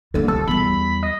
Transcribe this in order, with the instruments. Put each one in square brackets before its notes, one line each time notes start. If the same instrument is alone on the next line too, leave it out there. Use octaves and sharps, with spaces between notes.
[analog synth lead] D3 [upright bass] G3 A#3
[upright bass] C2 [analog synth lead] A4
[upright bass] E2 G3 [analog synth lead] B5
[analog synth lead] D#5